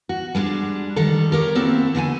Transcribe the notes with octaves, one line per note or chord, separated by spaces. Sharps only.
F#4
G3 G#3 C#4 D4
D#3 G3 A4
G4 A#4 C#5
A#3 C4 E4 F#4 A4
D3 A3 F#5 G#5